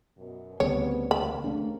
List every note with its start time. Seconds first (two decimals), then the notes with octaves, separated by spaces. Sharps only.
0.18 F#2 B2
0.60 D2 C#3 G3 B3 C4 C#5
1.11 E2 C3 A#3 B5
1.44 A3 C#4 D4